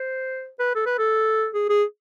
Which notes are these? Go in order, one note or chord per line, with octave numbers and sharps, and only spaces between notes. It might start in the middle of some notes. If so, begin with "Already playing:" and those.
Already playing: C5
B4
A4
B4
A4
G#4
G#4